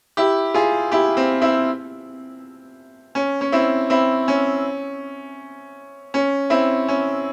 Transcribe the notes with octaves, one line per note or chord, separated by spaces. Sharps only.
E4 G4
F4 G#4
E4 G4
C4
C4 E4
C#4
C#4
C4 E4
C4 E4
C#4
C#4
C4 E4
C#4